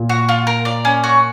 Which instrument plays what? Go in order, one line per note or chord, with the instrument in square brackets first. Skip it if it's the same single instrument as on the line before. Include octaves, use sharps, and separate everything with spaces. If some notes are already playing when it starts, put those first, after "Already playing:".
Already playing: [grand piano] A#2
[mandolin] F#4
F4
A#4
D5
C#4
F#4